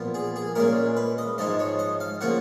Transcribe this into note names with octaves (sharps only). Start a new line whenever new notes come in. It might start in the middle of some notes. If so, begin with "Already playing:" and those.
Already playing: A#2 F3 B3 F4
G#4
G#4
A#2 G#3 C#4 A#4
B4
D#5
G#2 F3 G#3 D#4 D#5
C#5
D#5
F5
C#3 F3 A#3 F4 F#5